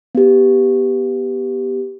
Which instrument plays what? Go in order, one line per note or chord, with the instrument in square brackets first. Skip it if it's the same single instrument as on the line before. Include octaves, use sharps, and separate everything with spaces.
[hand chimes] B3 G4